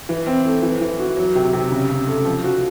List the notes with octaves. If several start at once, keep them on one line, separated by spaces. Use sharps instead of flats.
E3
C4
A3
E3
E3
F#4
F#3
C3
C3
C#3
C#3
A3
F3
F#4